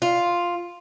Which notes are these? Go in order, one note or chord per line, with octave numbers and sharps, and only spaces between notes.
F4